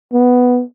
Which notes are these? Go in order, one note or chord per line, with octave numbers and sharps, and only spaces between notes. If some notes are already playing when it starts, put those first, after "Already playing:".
B3